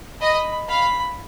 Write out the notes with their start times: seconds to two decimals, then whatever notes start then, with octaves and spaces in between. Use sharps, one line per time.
0.21 D#5 B5
0.68 F5 B5